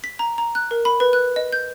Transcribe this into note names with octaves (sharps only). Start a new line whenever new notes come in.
B6
A#5
A#5
F#6
A#4
B5
B4
F#6
D#5
G6